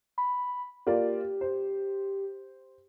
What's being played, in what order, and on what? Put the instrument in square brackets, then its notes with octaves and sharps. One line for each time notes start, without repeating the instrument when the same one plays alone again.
[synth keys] B5
[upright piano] A#3 F4 D5 [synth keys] G4
[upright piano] C5